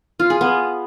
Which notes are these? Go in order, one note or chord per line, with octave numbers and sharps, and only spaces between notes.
F4
G#4
B3